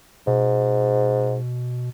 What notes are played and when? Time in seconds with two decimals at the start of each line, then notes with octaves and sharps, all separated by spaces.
0.27 G#2 B2